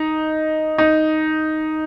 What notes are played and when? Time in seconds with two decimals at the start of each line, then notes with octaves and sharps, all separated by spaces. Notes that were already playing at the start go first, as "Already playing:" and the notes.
Already playing: D#4
0.78 D#4